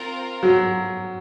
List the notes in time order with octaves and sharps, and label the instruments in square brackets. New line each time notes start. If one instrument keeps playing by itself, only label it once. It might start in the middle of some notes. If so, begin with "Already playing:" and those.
Already playing: [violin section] C4 F4 A#4
[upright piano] F#3